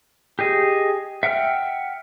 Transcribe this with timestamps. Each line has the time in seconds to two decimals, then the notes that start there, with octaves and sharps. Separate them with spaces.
0.39 G4 G#4 D#5
1.23 E5 F#5 G5 F6